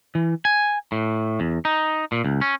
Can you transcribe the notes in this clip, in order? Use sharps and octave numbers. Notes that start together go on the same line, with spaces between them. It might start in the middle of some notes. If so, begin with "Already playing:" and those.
E3
G#5
A2
E2
D#4
A#2
C#2
C#4